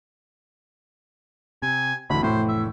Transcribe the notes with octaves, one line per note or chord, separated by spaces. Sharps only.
C3 G#5
F1 D2 E3 B5
A2 C5
E5